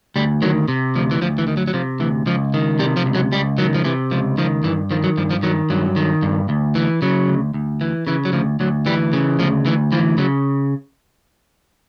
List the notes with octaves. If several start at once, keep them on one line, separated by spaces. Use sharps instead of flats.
D2 G3
D#3 F#3
C3
D2 F3
E3
D2 F3
E3
D#3
F#3
F#3
C3 F3
D2 E3
C#2 F3
D#3
C3 G3
F3
C#2
F#3
C#2 G3
D#3 F#3
F3
C3 E3
C#2 F3
D#3 F3
G2 E3
D#3 F3
F#3
G2 F3
F3
D#3 F#3
G2 F#3
D#3
G2
D2
E3
C#3 F#3
D2
D2
E3
C#3 E3
F#3
D2 F3
D2 F#3
E3 G3
C#3
D2 F3
D2 E3
E3 F3
C#3 F#3